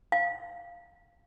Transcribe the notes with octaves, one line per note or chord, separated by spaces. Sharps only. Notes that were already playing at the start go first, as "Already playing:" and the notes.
F5